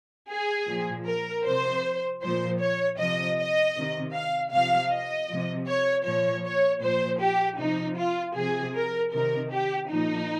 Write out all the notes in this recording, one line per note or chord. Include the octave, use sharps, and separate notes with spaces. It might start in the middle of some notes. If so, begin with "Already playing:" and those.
G#4
A#2 F3
A#4
C3 F3 C5
A#2 F3 C5
C#5
C3 F3 D#5
D#5
C3 D#3
F5
C3 F3 F5
D#5
C3 F3
C#5
A#2 F3 C#5
C#5
A#2 F3 C5
G4
C3 F3 D#4
F4
C3 F3 G#4
A#4
C3 D#3 A#4
G4
A#2 F3 D#4